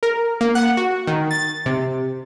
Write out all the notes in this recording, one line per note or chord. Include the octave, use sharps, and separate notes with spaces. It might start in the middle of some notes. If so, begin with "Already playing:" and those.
A#4
A#3
F#5
F#4
D#3
A6
C3